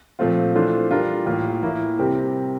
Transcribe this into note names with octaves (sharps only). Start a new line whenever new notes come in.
A#2 F3 A3 C4 F4
E3 A3 D4 F4 C5
E3 G3 D4 F4 A#4
A2 E3 A#3 F4
A2 E3 A#3 E4
C3 G3 C4 G4 A#4